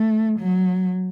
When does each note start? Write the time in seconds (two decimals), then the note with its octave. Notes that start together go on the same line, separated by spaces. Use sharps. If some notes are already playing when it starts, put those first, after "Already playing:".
Already playing: A3
0.39 F#3